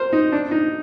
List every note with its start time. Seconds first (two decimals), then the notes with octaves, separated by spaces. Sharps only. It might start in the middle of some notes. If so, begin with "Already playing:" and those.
Already playing: A#4 C5
0.13 D#4
0.32 D4
0.51 D#4